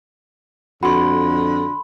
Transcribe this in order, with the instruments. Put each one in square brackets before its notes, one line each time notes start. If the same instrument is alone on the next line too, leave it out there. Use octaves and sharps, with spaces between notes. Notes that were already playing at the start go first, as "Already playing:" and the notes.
[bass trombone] F2 [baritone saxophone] D3 [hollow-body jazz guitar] F#4 [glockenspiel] B5 C6